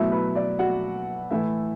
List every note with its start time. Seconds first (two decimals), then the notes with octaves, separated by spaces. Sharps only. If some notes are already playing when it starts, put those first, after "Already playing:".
Already playing: B2 F#3 A3 E4 E5
0.12 B4
0.35 D5
0.59 F#4 F#5
1.31 A2 E3 A3 E4 E5